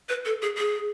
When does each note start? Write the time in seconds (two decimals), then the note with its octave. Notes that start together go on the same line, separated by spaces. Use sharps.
0.09 B4
0.25 A4
0.42 G#4
0.58 G#4